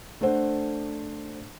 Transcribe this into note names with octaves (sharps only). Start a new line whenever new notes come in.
A3 D4 A4 C5 F#5